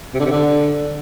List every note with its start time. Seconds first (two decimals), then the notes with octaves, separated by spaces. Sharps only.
0.14 C3
0.20 D3
0.25 C3
0.31 D3